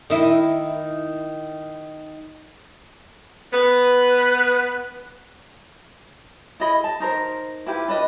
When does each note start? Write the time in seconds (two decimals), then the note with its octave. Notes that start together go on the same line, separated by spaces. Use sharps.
0.10 D#3 E4
3.52 B3 B4
6.60 E4 G#4 D#5 B5
6.84 A5
7.00 D#4 A#4 C5
7.66 E4 F4 G4 B4
7.88 D4 B4 D#5